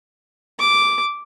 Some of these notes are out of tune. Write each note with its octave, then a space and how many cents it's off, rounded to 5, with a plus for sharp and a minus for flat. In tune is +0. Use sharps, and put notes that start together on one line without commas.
D6 -5